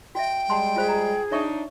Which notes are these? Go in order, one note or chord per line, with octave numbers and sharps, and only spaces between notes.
F#4 D#5 E5 G5
G3 G#3 F#5 A5 C6
F4 G#4 C5 F5
A#5
D4 D#4 C#5 E5 C#6